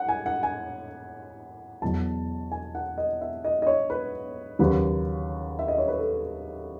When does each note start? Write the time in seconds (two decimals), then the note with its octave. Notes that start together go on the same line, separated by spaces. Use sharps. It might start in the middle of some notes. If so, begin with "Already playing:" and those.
Already playing: F#5
0.09 G#5
0.26 F#5
0.43 G#5
1.82 E2 B2 F#3 A5
2.52 G#5
2.75 F#5
2.98 D#5
3.21 E5
3.44 D#5
3.62 D#5
3.67 C#5
3.90 B4
4.59 D#2 C#3 F#3 B4
5.59 E5
5.68 D#5
5.78 C#5
5.88 B4
5.98 A4